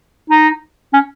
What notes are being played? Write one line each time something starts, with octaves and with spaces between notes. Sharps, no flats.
D#4
C#4